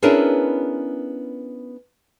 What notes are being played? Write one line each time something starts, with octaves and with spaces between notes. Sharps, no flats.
B3 C#4 D4 E4 G#4 A#4